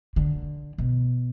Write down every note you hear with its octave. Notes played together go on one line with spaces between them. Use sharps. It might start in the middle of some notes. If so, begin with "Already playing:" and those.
D3
B2